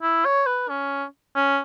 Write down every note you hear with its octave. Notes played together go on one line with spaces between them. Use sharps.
E4
C#5
B4
C#4
C#4